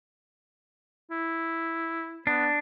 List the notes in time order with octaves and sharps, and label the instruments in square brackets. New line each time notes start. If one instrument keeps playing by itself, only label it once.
[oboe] E4
[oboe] B3 [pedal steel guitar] D4